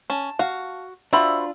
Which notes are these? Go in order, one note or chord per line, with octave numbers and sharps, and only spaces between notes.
C#4 A5
F#4 F5
D4 F4 F#4 C5 D5 E5 B5